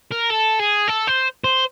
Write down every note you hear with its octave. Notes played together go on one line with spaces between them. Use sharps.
A#4
A4
G#4
A4
C5
C5